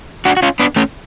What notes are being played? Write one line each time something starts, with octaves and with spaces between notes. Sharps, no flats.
D4 F#4
F#4
C#4 F4
B3 D4
A3 C#4